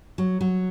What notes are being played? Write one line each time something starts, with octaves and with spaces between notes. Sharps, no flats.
F#3
F#3